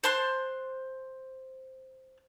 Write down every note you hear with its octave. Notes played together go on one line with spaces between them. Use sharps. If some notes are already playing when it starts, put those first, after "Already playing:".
C5 A5 C6 F#6